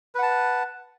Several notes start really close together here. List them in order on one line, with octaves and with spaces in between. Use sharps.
B4 F#5 A5